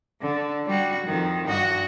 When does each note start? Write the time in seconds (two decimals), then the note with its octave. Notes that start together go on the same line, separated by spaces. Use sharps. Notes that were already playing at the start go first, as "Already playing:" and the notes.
0.21 D3
0.66 G3 F#4
1.06 F2 D#3
1.48 G2 F#4 D#5